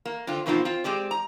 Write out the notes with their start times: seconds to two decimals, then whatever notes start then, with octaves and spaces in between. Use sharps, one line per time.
0.05 A#3
0.27 D3 C4 F4
0.46 B2 F3 A#3 C4 D#4 F4
0.65 C4 F4
0.84 G#3 C4 G4 D5
1.11 A#5